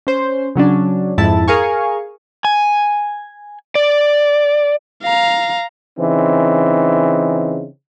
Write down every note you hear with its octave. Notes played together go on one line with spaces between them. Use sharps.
C#4 C5
C#3 F#3 C#4 D4
F2 G#2 E4 A5
G#4 A#4 F5 G#5 C#6
G#5
D5
F5 A#5
C#3 E3 C4 D#4